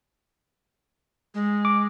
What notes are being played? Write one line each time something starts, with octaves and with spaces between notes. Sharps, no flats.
G#3
D6